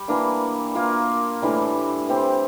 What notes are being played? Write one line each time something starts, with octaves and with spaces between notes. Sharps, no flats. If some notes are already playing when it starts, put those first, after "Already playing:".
Already playing: G3
E3 A#3 D4
A#3 F4 A#4
A2 E3 G3 D4
E3 G3 C4 G4